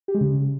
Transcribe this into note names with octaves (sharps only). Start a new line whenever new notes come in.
G4
G#3
C#3